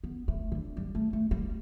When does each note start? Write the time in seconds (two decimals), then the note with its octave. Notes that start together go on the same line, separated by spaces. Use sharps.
0.04 B3
0.28 A3
0.52 D3
0.77 G3
0.95 A3
1.13 A3
1.31 G3